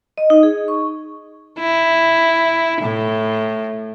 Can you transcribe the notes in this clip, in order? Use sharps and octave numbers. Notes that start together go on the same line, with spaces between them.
D#5
D#4
G#4
C#6
E4
A2